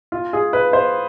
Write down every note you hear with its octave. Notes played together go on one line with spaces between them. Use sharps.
F4
G#4
B4
C5